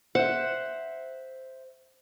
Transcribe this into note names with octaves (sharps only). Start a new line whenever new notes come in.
C5 E5 F#5